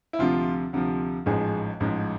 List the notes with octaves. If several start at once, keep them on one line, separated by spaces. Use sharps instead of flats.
E4
D2 C3 F3 F4
D2 C3 F3
A1 G#2 F3 G#4
A1 G#2 F3